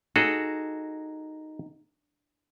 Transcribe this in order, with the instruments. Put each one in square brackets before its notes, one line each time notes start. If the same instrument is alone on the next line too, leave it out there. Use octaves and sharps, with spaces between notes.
[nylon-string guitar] D#4 [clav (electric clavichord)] F#4 G#4 A4